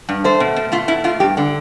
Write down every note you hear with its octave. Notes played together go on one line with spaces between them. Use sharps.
G2
A3 C5
B2
B2
A3 F4
B2 E4
B2 F4
G2 G4
D3